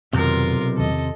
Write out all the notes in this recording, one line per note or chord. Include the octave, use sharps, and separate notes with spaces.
B1 F2 C3 D#3 F4 A#4
E2 D#3 C#4 A4 D#5